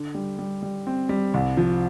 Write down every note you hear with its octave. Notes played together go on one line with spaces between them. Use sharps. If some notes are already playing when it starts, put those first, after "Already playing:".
Already playing: D3
G3
G3
G3
C4
G3
C2
F3